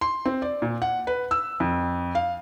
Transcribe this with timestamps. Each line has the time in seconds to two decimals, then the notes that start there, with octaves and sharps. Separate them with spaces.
0.01 C6
0.26 C4
0.42 D5
0.62 A#2
0.82 F#5
1.07 B4
1.31 E6
1.60 F2
2.15 F5